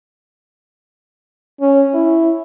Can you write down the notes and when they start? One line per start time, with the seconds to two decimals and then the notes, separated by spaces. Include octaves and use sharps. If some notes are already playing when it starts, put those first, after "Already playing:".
1.61 C#4
1.95 E4